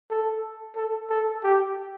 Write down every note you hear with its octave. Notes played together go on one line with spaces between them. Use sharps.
A4
A4
A4
G4